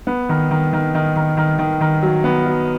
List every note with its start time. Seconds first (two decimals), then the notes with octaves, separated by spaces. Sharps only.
0.07 B3
0.29 D#3
0.51 D#3
0.73 D#3
0.95 D#3
1.16 D#3
1.37 D#3
1.59 D#3
1.81 D#3
2.02 F#3
2.24 B3
2.46 F#3